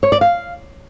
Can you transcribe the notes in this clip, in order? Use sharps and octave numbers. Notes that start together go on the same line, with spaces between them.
C#5
D5
F5